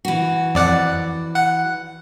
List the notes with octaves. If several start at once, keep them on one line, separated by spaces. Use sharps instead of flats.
E3 F#4
F2 D5 F#5
F#5